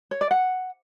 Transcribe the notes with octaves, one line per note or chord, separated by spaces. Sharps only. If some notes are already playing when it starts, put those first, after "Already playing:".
C#5
D5
F#5